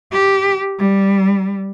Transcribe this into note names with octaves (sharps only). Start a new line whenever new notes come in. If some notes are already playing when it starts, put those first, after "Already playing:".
G4
G3